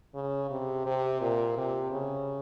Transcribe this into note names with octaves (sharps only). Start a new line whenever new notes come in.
C#3
C3
C3
A#2
C3
C#3